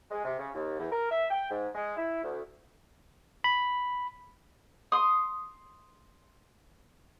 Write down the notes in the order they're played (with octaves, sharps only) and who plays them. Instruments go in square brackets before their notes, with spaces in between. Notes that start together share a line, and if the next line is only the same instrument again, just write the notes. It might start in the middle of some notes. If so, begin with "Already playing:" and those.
[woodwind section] G#3
C3
C#3
D#2
E2
A#4
E5
G5
G#2
G#3
E4
D2
[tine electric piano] B5
[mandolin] C6 D#6